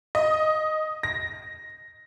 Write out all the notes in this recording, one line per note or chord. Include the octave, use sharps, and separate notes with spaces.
D#5
A#6